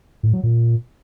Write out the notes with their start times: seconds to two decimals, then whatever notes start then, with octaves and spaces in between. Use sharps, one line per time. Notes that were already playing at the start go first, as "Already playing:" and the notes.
0.23 A2
0.33 F#3
0.43 A#2